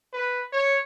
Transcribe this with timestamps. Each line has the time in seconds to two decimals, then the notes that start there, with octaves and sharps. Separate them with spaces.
0.13 B4
0.53 C#5